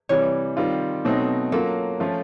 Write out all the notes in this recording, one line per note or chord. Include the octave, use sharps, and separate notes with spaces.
C3 E3 G3 C#5
D#3 G3 C4 F4
B2 F#3 A3 C4 D#4
F#3 A#3 C#4 F4 A4
F3 A3 C#4 F4